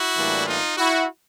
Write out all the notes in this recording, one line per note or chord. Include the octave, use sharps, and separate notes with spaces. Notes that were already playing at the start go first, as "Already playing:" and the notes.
Already playing: E4 F#4
A2 E3 G3 A#3 D4
D#4 F4
E4 F#4